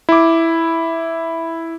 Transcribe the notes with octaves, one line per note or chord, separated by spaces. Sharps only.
E4 D6